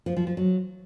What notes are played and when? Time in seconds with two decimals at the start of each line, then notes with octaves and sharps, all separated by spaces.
0.06 F3
0.16 F3
0.27 F3
0.37 F#3